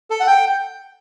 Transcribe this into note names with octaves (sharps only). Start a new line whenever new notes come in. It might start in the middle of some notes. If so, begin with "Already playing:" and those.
A4
F#5
G5